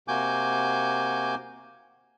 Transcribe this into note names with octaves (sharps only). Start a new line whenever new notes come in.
C3 A#3 F#4 G#5 D6 G6